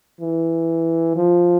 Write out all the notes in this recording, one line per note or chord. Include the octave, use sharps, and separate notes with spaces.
E3
F3